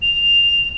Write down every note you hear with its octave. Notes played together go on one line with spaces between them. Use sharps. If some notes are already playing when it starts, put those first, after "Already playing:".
F7